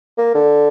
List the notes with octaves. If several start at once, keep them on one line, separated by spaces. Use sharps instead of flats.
A#3
D3